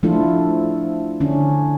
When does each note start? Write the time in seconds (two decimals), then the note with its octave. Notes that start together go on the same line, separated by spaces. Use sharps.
0.03 F3 A3 D4 E4 F4 A4
1.20 D3 C#4 D4